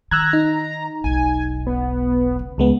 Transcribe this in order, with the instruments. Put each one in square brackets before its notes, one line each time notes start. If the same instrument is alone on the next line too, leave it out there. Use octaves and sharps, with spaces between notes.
[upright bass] D#3 [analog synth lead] A#5 [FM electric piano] E6 F#6 G#6
[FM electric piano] D#4
[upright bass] E1 B1 [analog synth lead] G#5
[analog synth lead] B3
[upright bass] C#3
[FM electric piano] C#2 G#3 B3